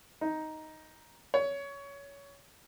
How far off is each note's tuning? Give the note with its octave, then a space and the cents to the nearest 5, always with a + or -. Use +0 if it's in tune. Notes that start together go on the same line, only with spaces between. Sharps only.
D#4 +5
C#5 +20